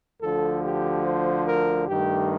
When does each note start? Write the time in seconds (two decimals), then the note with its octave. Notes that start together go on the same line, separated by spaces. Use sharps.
0.21 D2 D3 F3 A4
0.63 G4
1.04 C5
1.46 A#4
1.88 G2 D#3 A3 G4